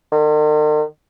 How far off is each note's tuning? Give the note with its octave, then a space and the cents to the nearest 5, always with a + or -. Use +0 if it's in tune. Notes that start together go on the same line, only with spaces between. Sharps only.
D#3 -45